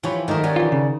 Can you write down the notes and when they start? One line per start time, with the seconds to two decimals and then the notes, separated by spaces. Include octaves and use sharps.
0.03 E3 F3 G4 B4 C#5
0.28 D#3 F#3 A3 G4 A#4 D#5
0.44 C#4 F#4 G4 D5 G#5
0.56 E3 F4
0.72 C#3